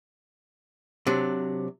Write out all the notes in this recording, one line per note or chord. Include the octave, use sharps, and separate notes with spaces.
C3 F#3 D4